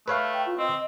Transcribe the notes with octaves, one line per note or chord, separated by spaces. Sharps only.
A3 B4 C#5 F5
G5
F4
C4 D#5